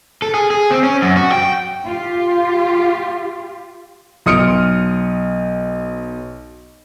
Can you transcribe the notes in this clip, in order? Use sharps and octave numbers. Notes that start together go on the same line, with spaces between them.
A4
G#4
G#4
C4
C#4
F#2
F#4
G5
F4 G4
B1 C6 D#6 F6 C#7 D7